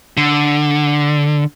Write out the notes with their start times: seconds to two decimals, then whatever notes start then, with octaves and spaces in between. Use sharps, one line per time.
0.17 D3